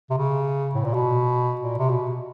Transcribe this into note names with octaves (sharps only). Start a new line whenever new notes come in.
C3
C#3
A2
A#2
B2
A#2
C3
B2